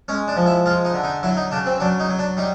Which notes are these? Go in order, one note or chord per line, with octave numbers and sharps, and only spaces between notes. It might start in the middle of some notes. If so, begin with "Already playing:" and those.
G#3 C#4
D4
F3
E4
G#3 F4
D#4
D3
D#4
F#3 E4
D#4
C#3 D4
C4
F#3 D4
D#4
F#3
D4
G3 D#4